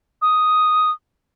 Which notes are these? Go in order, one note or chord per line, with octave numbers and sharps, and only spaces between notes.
D#6